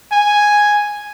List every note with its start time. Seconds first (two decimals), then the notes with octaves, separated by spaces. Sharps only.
0.12 G#5